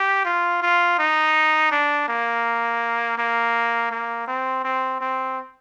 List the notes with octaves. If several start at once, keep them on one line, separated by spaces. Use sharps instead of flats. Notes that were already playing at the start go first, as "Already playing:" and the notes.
Already playing: G4
F4
F4
D#4
D4
A#3
A#3
A#3
C4
C4
C4